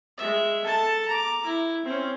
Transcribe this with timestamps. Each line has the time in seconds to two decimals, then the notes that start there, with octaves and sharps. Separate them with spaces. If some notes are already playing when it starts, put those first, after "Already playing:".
0.17 G#3 E5
0.64 A4 A5
1.07 A#5 D6
1.45 E4
1.85 C4 C#4